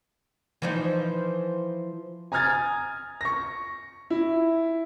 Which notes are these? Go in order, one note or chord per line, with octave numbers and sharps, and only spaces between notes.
E3 F3 D#4
G#5 A#5 D#6 F6 G#6 A6
C#6 A#6
E4